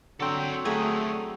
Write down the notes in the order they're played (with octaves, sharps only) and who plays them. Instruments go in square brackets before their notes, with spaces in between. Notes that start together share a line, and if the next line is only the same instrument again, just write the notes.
[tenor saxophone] D3 [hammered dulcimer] F#3 C4 [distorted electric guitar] A4 G5
[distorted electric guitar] D2 [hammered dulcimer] F#3 [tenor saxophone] A3 [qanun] G#4